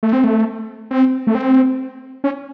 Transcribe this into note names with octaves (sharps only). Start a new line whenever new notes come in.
A3
C4
A3
C4
A3
C4
C#4